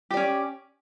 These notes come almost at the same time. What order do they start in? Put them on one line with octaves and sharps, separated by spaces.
G4 D5 C#4